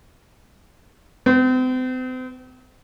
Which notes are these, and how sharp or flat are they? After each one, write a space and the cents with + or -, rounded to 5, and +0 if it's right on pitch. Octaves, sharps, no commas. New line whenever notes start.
C4 -40